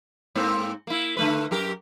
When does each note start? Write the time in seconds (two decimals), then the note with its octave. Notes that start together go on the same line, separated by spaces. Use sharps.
0.35 G#2 A#3 C4
0.87 A#3 E4
1.17 D3 A3 B4
1.51 F#2 G4 A#4